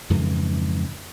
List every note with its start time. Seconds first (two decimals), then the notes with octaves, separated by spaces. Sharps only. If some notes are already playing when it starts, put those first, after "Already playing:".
0.10 F2 G#2 C#3 E3